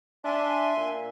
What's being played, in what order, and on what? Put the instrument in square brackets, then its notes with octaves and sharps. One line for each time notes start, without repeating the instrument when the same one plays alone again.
[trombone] D4 [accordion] E5 G#5 C6
[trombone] A#2